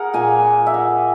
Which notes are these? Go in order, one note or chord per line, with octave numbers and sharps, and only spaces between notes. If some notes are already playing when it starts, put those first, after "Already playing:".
Already playing: G#4 A#4 F#5
A#2 A#3 G#5
E5
F#5